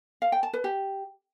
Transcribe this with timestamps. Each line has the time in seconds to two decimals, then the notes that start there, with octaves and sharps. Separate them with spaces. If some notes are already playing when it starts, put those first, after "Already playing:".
0.22 F5
0.32 G5
0.43 A5
0.53 B4
0.64 G4